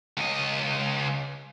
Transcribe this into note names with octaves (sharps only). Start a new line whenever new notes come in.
C#2 D#5